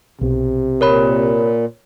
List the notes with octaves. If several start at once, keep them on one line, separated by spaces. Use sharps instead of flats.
B1 C3
A#2 A#4 C#5 B5